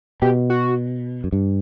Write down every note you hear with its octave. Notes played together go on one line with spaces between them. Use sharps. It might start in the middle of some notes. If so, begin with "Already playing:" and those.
B2 G4
F#4
F#2
G2